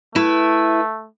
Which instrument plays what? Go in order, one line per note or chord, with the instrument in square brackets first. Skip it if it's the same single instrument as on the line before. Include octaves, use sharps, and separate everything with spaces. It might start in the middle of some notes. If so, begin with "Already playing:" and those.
[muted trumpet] A3 [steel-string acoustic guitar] E4 B4 E5